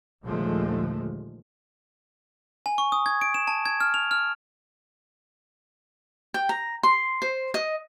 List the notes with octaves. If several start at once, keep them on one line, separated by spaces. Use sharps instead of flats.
A#1 D#2 D3 F3 G#3 A3
G#5
C#6
D#6
G#6
D7
E7
A5
G#6
F6
F7
F6
G5
A#5
C6
C5
D#5